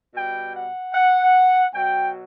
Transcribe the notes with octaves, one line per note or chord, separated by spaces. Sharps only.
B2 G3 G5
F#5
F#5
B2 F#3 G5